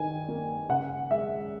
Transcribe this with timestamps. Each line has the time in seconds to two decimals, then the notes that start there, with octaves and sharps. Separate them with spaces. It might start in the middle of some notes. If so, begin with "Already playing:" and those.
Already playing: D#3 G#5
0.28 A#3
0.69 C#3 F#5
1.11 G#3 E5